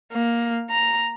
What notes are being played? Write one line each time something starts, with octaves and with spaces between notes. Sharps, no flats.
A#3
A#5